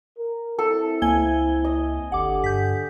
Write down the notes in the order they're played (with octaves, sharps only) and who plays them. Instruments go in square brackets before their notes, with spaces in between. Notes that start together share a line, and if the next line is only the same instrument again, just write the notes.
[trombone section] A#4
[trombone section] C4 E4 [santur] A4
[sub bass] C#2 [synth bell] A#3 G#6 G7 [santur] G#5
[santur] D#5
[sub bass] G1 [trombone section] D3 G4 [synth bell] F#5 D6
[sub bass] G2 [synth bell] G6 B6